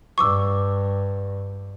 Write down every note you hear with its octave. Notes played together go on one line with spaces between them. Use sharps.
G2 C#6 D6 E6